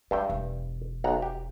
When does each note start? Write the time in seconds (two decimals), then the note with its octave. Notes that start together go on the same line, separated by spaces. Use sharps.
0.11 G2 G#3 E5 G5
0.30 E1
1.04 B1 F#5 A#5
1.22 G4